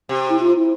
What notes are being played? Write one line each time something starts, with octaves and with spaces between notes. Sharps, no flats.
C3 G4
E4
F4
E4